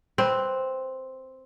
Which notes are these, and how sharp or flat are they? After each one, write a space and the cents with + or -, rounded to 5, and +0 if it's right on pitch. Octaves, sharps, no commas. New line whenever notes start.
C4 +0 B4 +5